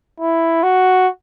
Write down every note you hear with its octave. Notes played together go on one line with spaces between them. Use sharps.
E4
F#4